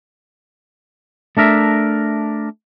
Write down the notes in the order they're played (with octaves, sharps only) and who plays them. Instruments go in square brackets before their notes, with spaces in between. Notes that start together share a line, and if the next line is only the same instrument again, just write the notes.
[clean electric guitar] A3 D4 A#4 E5